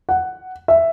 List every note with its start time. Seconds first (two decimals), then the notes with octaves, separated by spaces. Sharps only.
0.09 F#5
0.68 E5